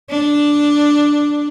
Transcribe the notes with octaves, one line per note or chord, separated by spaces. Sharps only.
D4